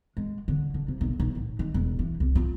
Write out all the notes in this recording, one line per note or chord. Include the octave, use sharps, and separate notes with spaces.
G#3
D3
D3
C3
B1
B1
A2
D#3
E1
E3
C2
F4